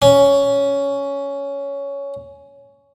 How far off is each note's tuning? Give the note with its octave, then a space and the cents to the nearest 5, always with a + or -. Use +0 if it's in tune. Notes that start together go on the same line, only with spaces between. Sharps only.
C#4 +10